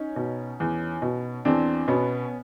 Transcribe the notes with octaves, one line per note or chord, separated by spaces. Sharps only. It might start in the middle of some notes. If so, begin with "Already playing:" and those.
Already playing: C#4 D#4
B2
E2
B2
E2 C4 D4
B2 B3 C#4